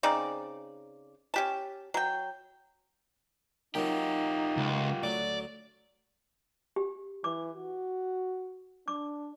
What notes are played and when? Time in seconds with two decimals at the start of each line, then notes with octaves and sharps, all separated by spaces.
0.03 C#3 C4 D#4 D5
1.34 C#4 G4 A5
1.94 F#3 G5
3.75 F#3 A#3 D#4 F4 G4
4.57 C#2
5.03 D2 F#3 D5
6.76 G4
7.24 E3 D6
7.56 F#4
8.88 D4 D6